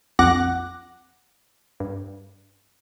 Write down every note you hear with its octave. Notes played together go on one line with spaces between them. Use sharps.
A#1 F2 F#5 D6 F#6 A#6
G2